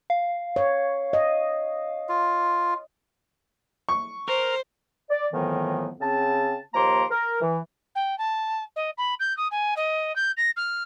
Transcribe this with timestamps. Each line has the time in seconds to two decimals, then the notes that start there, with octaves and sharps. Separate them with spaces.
0.10 F5
0.56 C#5
1.13 D#5
2.09 F4
3.89 C#6
4.28 A#4 C5
5.10 D5
5.32 F2 A2 D#3 E3 F#3 B3
6.01 C#3 C4 A5
6.74 D#2 F3 A#3 A#5 C6 D6
7.11 A#4
7.41 E3
7.95 G5
8.18 A5
8.76 D#5
8.98 B5
9.20 G6
9.37 D#6
9.51 G#5
9.77 D#5
10.16 G6
10.37 A#6
10.57 F6